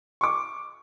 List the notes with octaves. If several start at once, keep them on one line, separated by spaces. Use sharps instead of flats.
C#6 D6